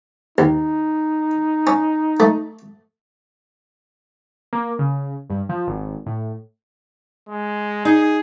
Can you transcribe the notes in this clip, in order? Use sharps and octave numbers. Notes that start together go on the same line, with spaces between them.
D#2 D#4
C#4
A3
A#3
C#3
G2
F3
G#1
A2
G#3
D#4 G#4